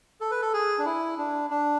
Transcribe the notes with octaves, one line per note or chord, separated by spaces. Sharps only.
A4
B4
A4
G#4
D4
E4
D4
D4